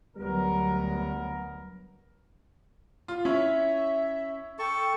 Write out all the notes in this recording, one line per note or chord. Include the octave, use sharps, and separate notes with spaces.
D2 F#3 G3 B3 A#4
F4
C#4 E4 C#5 E5
A4 G5 A5 C#6